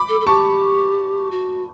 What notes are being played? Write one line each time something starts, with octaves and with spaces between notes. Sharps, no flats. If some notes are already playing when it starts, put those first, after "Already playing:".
Already playing: B5 D6
A4
A4
G4 A5 C#6
F#4